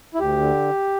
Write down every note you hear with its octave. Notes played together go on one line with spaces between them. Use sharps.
E4
D2 G4
D3